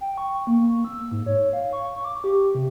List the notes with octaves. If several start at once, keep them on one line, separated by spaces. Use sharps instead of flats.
G5
C#6
A#3
E6
G#2
C#5
F5
C#6
D6
G4
C3